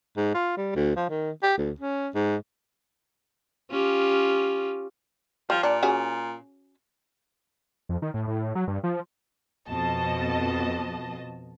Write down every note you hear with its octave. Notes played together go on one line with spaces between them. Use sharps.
G#2
F4
G3
D2
F3
D#3
G4
D2
C#4
G#2
C#4 F4 G4
F3 G3
A#2 D4
C#4 F#4 G#4
F2
D#3
A2
A2
F#3
G2
F3
F2 B2 D#5 A5